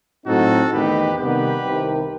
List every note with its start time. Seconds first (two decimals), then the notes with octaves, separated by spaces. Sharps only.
0.26 A2 F#3 C4 D#4 F#4 A4
0.72 E2 D#3 A3 D#4 G4 B4
1.18 C3 D#3 G3 B3 G4 B4
1.65 C2 C3 D#3